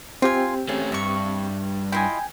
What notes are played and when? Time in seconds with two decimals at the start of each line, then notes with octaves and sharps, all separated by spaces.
0.22 C4 F4 G4 G5 G#5
0.69 A3 C#4 G#4
0.92 G2 E5 C#6
1.92 E4 F4 D#5 G5 G#5